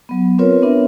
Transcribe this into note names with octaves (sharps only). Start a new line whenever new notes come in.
F#3 B3
C4 F4 A#4 B4 C#5
B3 D4 A#4 E5